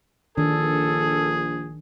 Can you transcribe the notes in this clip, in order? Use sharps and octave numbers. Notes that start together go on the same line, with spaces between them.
A#1 D#3 D4 G#4 A4